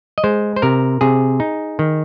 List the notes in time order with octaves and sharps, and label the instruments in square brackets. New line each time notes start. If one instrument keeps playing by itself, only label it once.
[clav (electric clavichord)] D#5
G#3 C5
C5
C3 A#4
C3 G#4
D#4
D#3